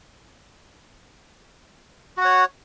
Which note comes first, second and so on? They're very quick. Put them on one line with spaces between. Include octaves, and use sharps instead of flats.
F#4 F#5 C#5